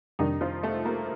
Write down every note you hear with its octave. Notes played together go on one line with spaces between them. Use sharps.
F2 C3 D#3 G3 D4 D#4
F3 F4
A3 A4
A#3 A#4